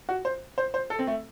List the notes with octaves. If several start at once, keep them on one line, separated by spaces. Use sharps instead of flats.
F#4
C5
C5
C5
A4
C4
A3